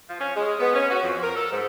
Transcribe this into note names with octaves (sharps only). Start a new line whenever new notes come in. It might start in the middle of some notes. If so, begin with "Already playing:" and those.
F3
C#4
G#3
B3
C#4
F#4
F2
A#4
A4
G#2